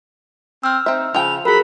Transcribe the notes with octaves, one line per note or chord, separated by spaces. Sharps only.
C4 E6 F6
C4 D#4 E5
C#3 F3 G5 F7
F#3 G#4 A#4 B5